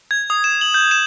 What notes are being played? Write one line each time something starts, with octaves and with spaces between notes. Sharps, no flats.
G#6
D#6
E7
F#7
G6
E7